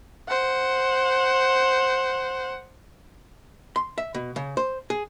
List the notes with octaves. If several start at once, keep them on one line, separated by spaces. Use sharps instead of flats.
C5 F#5
C6
E5
B2
C#3
C5
G#4